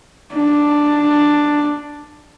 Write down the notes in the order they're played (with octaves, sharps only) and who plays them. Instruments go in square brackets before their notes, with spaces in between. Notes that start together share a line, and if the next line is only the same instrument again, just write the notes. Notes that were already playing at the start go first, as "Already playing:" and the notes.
[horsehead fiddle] D4